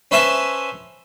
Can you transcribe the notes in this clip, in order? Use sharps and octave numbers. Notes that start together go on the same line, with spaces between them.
C#4 B4 C5 E5 G#5 A5